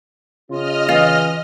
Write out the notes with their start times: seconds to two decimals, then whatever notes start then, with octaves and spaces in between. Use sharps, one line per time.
0.50 C#3 F4 D#5 F6
0.89 E3 F4